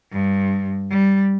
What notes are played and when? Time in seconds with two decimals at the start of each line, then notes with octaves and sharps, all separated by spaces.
0.12 G2
0.91 G3